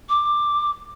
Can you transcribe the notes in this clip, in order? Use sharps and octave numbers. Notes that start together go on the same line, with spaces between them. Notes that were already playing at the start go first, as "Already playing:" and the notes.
D6